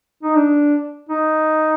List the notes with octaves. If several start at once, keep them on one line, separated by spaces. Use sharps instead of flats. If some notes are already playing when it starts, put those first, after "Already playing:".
D#4
D4
D#4